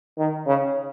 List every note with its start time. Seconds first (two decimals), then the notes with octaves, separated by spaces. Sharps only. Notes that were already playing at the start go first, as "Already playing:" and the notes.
0.18 D#3
0.46 C#3